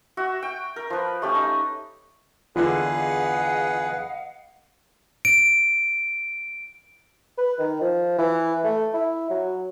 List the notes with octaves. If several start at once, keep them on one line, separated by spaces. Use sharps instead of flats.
F#4 E5
G5
A#4
F3 B4
A3 C#4 G4
D#4
E2 D3 F4 G#4 B4 D#5 F5 F#5
D7
B4
D#3
F3
E3
A3
E4
F#3